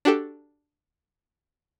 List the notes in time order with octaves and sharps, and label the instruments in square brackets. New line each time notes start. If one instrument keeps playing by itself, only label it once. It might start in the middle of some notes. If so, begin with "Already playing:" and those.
[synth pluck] D4 F#4 G4 A4